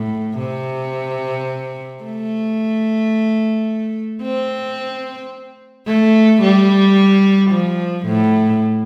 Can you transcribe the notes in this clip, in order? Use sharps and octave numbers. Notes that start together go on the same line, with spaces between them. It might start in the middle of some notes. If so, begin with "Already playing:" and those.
Already playing: A2
C3
A3
C4
A3
G3
F3
A2